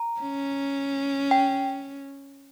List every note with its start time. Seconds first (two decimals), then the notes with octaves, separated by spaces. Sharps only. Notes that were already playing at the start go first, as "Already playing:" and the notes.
Already playing: A#5
0.21 C#4
1.31 G5